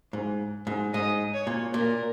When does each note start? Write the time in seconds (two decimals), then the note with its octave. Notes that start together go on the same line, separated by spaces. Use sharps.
0.13 G#2
0.67 G#2
0.93 G#2 D#5
1.34 C#5
1.47 A#2
1.74 A#2 A#4